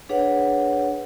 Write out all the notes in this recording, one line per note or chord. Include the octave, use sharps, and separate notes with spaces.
D4 G#4 B4 C#5 F#5